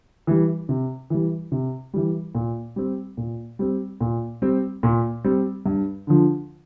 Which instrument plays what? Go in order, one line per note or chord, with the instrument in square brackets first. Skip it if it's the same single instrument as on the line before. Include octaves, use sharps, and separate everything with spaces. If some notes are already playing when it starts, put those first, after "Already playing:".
[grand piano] E3 G3
C3
E3 G3
C3
E3 G3
A#2
G3 C4
A#2
G3 C4
A#2
G3 C4
A#2
G3 C4
G2
D3 F3